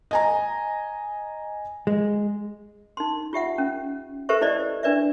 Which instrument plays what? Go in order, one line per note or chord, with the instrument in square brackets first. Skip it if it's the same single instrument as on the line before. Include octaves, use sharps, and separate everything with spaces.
[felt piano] D#5 G#5 A#5
[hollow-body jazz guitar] G#3
[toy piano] D#4 C6
F4 G4 E5 F#5
C#4
G4 A4 B4 C5 E5 C#6
E4 C5 D5 D#5
D4 B4 D5 E5